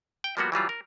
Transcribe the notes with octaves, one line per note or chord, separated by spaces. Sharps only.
G5
F3 G3 A#3 B3 F#4
E3 F#3 G3 F4
A#4